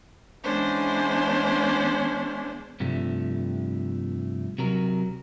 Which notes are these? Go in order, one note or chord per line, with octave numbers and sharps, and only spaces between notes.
E3 G#3 B3 C#4 D4 C5
G2 C3 F3 A3
C3 F#3 A#4